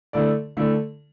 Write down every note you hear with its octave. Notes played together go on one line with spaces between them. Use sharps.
D3 A3 E4 A4 D5
D3 A3 E4 A4 D5